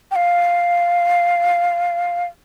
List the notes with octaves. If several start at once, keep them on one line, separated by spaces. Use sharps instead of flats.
G5
F5